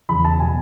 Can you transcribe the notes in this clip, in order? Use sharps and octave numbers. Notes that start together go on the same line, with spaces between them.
E2 C#3 E3 B5
A5
B2 F#3 G#5